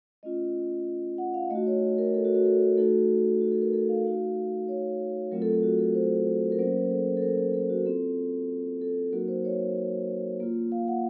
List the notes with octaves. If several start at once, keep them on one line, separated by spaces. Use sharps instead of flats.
A3 C#4 F4 D#5
F#5
F5
A3 D#4 F#4 D#5
C#5
A#4
A4
F#4
F#4
A4
A#4
A3 D#4 F#4 A4
F#4
A4
A#4
A4
F5
A3 D#4 F#4
C#5
F#3 A3 C4 F4 A#4
A4
A4
F#4
A4
C5
A#4
F#3 A#3 C#4 C5
A4
A4
A#4
A#4
A4
F#4
C4 F4 A4
A4
F#3 A#3 D#4 F#4 A#4
C5
C#5
A#3 F4
F5
F#5